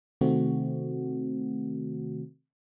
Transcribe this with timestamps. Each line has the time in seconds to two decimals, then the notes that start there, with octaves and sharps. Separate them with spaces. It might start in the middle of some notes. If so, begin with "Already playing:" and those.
0.21 C3 D#3 A3 C4 F#4